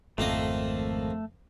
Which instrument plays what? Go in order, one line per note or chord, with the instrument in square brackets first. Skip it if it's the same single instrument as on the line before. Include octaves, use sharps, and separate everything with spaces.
[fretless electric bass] G#1 [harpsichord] F2 A#3 D#5 [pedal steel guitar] A3